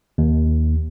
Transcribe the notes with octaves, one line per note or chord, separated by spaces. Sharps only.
D#2